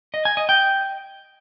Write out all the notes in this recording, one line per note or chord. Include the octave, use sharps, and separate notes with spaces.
D#5
G#5
D#5
G5